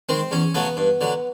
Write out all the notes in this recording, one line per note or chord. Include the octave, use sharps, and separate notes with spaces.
D#3 G#3 C4
E2 C#4
C#3 F#3 A3 B3
G2
D3 F#3